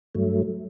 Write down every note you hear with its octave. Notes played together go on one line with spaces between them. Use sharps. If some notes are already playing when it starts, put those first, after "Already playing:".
G2 F#3 A3